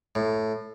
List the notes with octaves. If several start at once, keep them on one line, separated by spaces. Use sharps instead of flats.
A2